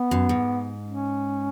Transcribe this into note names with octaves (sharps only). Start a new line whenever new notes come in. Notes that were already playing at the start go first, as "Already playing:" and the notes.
Already playing: B3
F#2
G#2
C#4